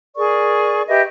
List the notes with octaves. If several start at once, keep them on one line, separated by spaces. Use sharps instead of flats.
G#4 A#4 D5 C#6
G4 B4 D#5 E5